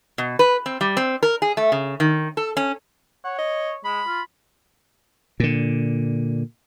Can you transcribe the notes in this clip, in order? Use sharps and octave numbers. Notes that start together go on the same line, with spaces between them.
B2
B4
C4
G3
C4
A#4
G#4
A3
C#3
D#3
A4
C#4
C#5 F#5
D#5
G#3 B5
F4
A#2 D3